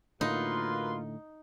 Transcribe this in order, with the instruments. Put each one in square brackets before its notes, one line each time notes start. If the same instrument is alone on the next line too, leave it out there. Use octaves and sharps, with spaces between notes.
[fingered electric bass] A2 D3 [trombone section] A#3 F4 [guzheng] D#4 [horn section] F#4 B4 C6